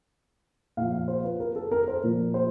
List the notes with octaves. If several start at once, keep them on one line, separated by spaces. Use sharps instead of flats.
A#2 F3 F5
F5
C5
B4
A#4
A4
A#4
C5
A#2 F3
C5